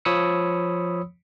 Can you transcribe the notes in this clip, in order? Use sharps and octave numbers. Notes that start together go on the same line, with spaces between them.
F3 C#5 B5 D#6 E6 C#7